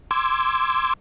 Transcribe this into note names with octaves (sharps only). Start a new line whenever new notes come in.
C6 D6 E6 G#6